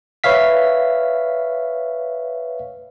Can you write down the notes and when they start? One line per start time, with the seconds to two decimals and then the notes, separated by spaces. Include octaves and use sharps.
0.24 B4 C#5 E5 F5 B6